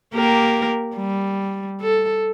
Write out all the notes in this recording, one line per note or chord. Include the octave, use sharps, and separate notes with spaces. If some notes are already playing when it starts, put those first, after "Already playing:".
A#3 G4 A#4
G3
A4